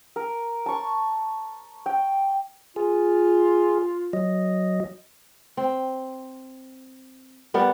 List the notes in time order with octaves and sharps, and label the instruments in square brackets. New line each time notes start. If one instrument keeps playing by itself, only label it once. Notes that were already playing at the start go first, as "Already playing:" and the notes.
[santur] A#4
A5 C#6
G5
[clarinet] F4 [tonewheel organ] G#4
[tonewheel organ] F#3 D#5
[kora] C4
G3 B3 A#4 F#5